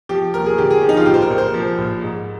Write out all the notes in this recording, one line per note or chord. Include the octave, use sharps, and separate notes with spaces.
F3 G4
D#2 A#4
G#4
D3 G4
G#4
F3
D#4
F4
A#1 G4
C5
A#4
A#1
C5
F3
A#1
G#2